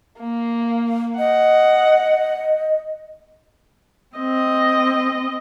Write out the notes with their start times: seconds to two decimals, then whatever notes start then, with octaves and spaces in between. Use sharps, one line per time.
0.20 A#3
1.18 D#5 F#5
4.16 C4 D#5